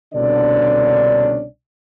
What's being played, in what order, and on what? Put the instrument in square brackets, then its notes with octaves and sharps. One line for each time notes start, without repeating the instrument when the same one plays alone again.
[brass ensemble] C2 B2 D3 C#4 D4 D5